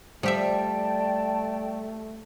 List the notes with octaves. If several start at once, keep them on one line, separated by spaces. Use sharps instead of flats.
F3 G3 A3 G4 D5 E5 G5 A5